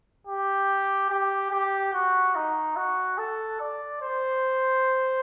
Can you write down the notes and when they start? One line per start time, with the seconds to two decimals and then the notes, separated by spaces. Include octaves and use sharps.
0.27 G4
1.10 G4
1.51 G4
1.93 F#4
2.35 D#4
2.76 F#4
3.18 A4
3.60 D5
4.02 C5